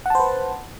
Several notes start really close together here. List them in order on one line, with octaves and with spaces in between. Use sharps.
F#5 A5 C5 B4